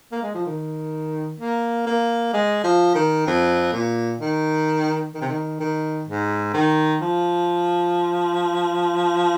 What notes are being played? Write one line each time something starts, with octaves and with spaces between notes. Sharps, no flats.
A#3
G#3
F3
D#3
A#3
A#3
G#3
F3
D#3
F2
A#2
D#3
D#3
C3
D#3
D#3
G#2
D#3
F3